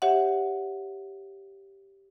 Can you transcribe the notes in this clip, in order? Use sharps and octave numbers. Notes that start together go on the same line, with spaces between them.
G4 C#5 E5 F#5